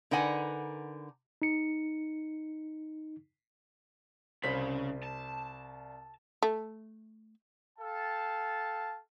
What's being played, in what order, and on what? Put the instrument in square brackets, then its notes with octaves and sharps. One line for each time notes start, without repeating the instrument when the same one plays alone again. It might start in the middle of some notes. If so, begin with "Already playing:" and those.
[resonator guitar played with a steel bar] D3 D#4 A#4 B4 F#5 G#5
[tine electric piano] D#4 C#7
[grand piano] C2 C5 B6 [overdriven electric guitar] C#3 B5
[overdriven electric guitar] A5
[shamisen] A3
[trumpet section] A4 F5 G5 A5